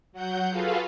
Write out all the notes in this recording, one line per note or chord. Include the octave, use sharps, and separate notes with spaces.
F#3 F#5 G6
F4 F#4 G#4 A4 B4 F5